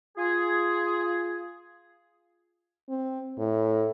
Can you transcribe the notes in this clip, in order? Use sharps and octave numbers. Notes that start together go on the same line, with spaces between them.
F4 G#4
C4
A2